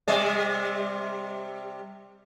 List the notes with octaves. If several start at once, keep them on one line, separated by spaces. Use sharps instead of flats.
C3 G3 D5